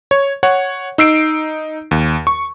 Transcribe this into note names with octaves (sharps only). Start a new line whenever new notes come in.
C#5
C#5 F#5
D#4 E6 C7 D7
D#2
C#6